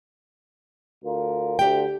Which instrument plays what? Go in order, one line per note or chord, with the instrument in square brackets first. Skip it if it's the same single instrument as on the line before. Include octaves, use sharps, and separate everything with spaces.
[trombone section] D2 F4 A#4
[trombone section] D2 [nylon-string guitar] G4 G5